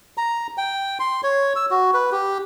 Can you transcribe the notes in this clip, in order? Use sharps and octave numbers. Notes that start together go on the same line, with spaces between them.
A#5
G5
C6
C#5
E6
F#4
B4
G4